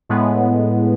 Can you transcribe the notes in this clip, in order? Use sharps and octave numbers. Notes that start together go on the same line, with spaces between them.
A2 G#3 B3